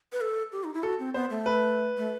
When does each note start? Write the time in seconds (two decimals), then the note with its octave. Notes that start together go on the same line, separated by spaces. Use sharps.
0.13 B4
0.21 A4
0.52 G4
0.64 D#4
0.74 E4
0.83 F#4 A4
0.99 C4
1.14 B3 C5
1.30 A3
1.46 B4
1.97 A3